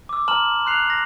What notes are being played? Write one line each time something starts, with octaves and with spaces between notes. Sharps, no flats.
D6 E6
A5 A#5 C6 F6 E7 F#7
C6 F#6 C7 F7
A#6